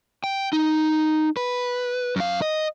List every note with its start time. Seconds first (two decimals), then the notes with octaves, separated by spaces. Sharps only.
0.24 G5
0.53 D#4
1.37 B4
2.16 F#2 F5
2.42 D#5